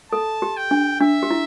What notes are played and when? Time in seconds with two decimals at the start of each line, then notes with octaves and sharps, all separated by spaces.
0.12 A4 A5
0.42 G4
0.57 G5
0.71 D4
1.01 D4 E5
1.23 G4
1.31 E4